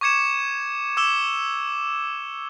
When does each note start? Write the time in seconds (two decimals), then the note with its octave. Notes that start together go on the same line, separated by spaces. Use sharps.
0.01 C#6 D6 G#6 C#7 E7
0.97 D6 E6 E7 G7